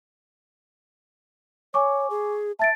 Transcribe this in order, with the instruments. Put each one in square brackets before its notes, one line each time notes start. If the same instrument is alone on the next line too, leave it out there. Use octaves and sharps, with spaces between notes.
[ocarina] C#5 [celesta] G#5 C#6 D6
[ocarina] G#4
[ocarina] E5 [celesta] A5 A6 D7